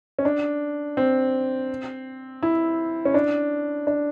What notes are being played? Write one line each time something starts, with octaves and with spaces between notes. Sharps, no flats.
C#4
D4
C4
E4
C#4
D4
D4